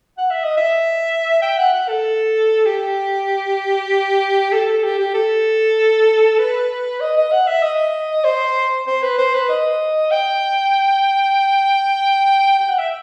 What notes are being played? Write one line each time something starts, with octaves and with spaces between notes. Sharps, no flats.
F#5
E5
D#5
E5
G5
F#5
F#5
A4
G4
A4
A4
G4
G4
A4
B4
D#5
D#5
F#5
E5
D#5
C5
C5
B4
C5
B4
D#5
G5
G5
F#5
E5